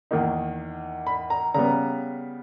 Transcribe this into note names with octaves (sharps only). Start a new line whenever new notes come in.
E2 D#3 A#3 D#4
B5
A#5
C#3 G3 B3 A#5